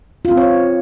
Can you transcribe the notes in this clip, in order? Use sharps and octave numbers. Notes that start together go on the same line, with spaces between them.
F4
C4
C#5